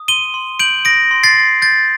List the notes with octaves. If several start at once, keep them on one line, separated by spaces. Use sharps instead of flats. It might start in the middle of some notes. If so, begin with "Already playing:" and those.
Already playing: D#6
C6 D#7 G7
C6
G6 D7 F#7
D#6 A#6 D7
C6
A6 C7
C6
G6 A6